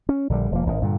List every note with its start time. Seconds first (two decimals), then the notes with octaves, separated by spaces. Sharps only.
0.09 C#4
0.29 A#1 D3 F3 G3
0.51 E1 F3 A#3
0.66 G#1 D#3
0.82 G2 A#2 D3